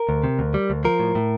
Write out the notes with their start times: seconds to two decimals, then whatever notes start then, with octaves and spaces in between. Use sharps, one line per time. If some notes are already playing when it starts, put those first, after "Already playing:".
Already playing: A#4
0.09 D2
0.24 C3
0.39 D2
0.54 G3
0.70 D2
0.85 F3 A#4
1.00 A2
1.15 A2